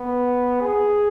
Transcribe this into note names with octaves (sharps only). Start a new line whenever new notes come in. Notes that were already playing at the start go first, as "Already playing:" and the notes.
Already playing: B3
G#4